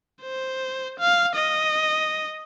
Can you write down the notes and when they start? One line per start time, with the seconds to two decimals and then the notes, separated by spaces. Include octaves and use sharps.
0.22 C5
1.00 F5
1.35 D#5